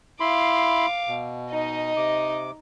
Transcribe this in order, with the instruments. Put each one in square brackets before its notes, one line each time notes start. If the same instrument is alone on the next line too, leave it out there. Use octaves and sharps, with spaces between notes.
[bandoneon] E4 B5 C6 [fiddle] F5 D6
[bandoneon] B2
[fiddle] D#4 D#5
[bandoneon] C3 D6